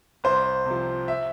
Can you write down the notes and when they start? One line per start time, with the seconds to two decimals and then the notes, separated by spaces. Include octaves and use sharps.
0.24 C2 C5
0.66 C3 F3
1.08 E5